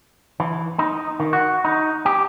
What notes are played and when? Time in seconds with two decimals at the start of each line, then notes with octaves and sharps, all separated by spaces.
0.40 E3
0.79 D#4
1.20 D#3
1.33 F#4
1.65 D#4
2.06 G4